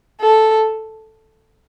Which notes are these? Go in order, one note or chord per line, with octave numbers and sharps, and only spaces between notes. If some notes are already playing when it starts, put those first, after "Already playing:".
A4